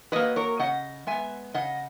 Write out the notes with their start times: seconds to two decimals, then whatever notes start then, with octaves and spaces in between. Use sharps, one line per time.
0.12 F#3 A#3 B4 D#5
0.36 A#4 C#5
0.59 C#3 D#5 F#5
1.07 G#3 B3 E5 G#5
1.54 C#3 D#5 F#5